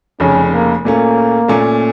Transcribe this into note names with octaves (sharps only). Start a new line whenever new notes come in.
F1 F2 C#3 C#4
A#3
A#2 A3 A#3 C#4
A#2 A3 C#4